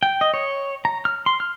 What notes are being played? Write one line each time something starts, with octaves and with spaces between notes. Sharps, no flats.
G5
D#5
C#5
A#5
F6
C6
F6